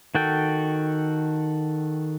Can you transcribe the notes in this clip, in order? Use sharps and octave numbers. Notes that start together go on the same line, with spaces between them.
D#3 F#4 A4 G5